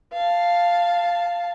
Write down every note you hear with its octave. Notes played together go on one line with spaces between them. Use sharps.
F5 A5